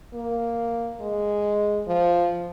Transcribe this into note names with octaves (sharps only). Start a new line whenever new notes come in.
A#3
G#3
F3